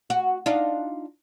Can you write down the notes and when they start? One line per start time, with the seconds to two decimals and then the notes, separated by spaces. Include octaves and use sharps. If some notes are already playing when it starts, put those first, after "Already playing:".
0.10 F#4
0.46 D4 D#4 F4